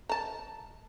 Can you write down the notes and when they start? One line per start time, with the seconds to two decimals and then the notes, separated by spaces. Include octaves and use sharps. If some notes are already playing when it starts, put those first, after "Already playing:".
0.09 A5 A#5